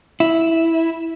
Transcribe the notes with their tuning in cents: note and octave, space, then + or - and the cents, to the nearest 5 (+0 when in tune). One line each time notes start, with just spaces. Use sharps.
E4 -10